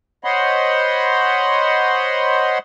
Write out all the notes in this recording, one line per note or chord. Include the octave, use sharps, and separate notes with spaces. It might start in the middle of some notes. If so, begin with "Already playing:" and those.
C5 C#5 D#5 F#5 B5 C6